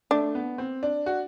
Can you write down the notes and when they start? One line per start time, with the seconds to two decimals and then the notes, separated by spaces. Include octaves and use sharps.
0.11 A3 D4
0.35 B3
0.58 C4
0.83 D4
1.06 F#4